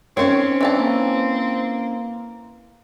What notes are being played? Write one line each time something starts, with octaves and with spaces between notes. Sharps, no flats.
D#3 C4 C#4 C5 C#5
E3 D4 E4 A5
A#3